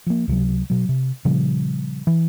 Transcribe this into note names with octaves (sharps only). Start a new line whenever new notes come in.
F3 A#3
C#2 C3 F3 F#3
B2 F#3
C3
A#2 C#3 F3 G3
E3